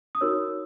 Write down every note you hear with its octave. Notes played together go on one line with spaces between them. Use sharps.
D#6
D#4 F#4 A#4 C#5 E6